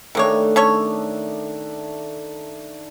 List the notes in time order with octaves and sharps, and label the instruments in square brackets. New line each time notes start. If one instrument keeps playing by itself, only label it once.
[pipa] C3 A#3 C#5 [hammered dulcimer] D#3 A3 D4
[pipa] C#4 A4 C#5